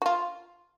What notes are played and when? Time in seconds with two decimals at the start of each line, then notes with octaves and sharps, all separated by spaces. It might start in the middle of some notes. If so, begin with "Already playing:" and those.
0.02 F#4
0.06 F4